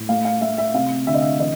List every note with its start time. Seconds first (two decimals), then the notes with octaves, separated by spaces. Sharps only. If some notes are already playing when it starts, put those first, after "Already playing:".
Already playing: A2
0.09 A3 F5
0.25 F5
0.41 A3 E5
0.58 E5
0.74 C3 F5
1.07 D2 E5
1.14 D#5
1.22 E5
1.39 E3 D#5